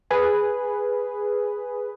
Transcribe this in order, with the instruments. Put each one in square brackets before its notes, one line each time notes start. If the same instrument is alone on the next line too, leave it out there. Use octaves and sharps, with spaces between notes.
[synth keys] G#4 B4